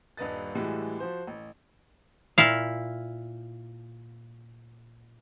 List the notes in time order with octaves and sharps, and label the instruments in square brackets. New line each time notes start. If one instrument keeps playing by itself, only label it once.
[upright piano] D#1 G2 B4 D#5 A6
A2 E3 G3 G#3 F#4
F3 F#4 C5 C6
A1
[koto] A#2 E4 F5